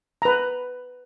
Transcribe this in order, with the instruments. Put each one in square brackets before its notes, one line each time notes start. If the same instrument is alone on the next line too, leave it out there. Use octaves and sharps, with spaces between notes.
[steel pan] B4 A#5